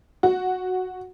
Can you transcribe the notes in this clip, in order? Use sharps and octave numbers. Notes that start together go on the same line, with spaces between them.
F#4